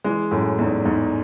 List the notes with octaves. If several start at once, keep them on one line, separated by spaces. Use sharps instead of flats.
E3 G#3
F#2 A2
E2 G#2
E2 G#2